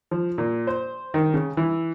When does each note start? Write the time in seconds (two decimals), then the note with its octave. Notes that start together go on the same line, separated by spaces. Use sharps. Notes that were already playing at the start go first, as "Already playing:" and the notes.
0.11 F3
0.38 A#2
0.67 C5
1.14 D#3
1.34 C#3
1.57 E3